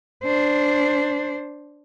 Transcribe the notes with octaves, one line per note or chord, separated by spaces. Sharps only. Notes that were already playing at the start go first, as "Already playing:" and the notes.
D4 C5